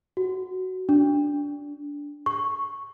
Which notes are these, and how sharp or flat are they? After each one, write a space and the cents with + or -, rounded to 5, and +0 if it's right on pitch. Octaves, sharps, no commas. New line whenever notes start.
F#4 +10
D4 -15
C#6 -5